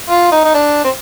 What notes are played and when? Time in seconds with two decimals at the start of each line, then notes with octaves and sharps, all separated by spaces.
0.09 F4
0.32 D#4
0.44 D#4
0.54 D4
0.84 C4